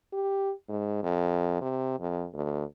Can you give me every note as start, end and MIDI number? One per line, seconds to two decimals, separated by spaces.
0.13 0.52 67
0.69 1.02 44
1.03 1.58 41
1.61 1.99 48
2.00 2.27 41
2.34 2.64 38